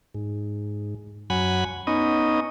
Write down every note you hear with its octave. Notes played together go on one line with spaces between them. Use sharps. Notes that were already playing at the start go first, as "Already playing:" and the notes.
G#2
F#2 F#3 F#5 G#5 B5
B3 C#4 D#4 D#5